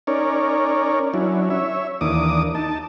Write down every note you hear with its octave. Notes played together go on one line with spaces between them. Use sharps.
C#4 D#4 A#4 C#5 D5
F#3 C#4 D4 E4
C#5 E5
D#2 E3 A#3 D4 D6 D#6
D#4 A5